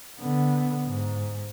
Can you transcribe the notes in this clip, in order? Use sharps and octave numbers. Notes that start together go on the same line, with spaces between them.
D3 B3
G#2